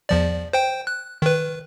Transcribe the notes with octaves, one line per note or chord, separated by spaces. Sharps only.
E2 F3 D5
C5 G5
F#6
D#3 B4